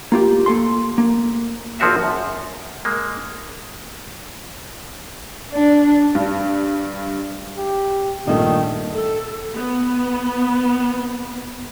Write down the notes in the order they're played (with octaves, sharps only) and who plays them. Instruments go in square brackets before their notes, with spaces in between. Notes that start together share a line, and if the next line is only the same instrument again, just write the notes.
[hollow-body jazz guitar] A#3 F4 G4
A#3 A4 C6
A#3
[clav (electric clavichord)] G#1 F3 C4 F#4 E5 F5
F#2
G#3 A#3
[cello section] D4
[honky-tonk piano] G2
[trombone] G4
[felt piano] A#1 G2 A#2 [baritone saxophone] D#3 [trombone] A3
[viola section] A4
B3